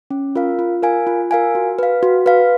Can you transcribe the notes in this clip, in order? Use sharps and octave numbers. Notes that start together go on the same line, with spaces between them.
C#4
F4 A#4 F5
F4
A#4 F5 G#5
F4
A#4 F5 G#5
F#4
B4 F5
F#4
B4 F5